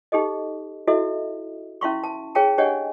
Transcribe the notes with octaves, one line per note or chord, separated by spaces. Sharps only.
D#4 G4 A4 D#5
E4 F#4 A4 D#5 E5
C#4 E4 E5 F5 C6 C#6
A5
G#4 C#5 F5 G5 A5
D4 G4 C#5 D#5 F#5 G#5